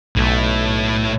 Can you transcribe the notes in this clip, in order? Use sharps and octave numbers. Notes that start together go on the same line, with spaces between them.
B1 A2 A3